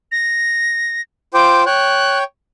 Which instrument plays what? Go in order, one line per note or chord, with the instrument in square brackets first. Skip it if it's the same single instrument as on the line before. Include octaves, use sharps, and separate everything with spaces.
[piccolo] A#6
[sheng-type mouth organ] F4 C5 G5 [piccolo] D6
[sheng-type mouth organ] C#5 G5 [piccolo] F#6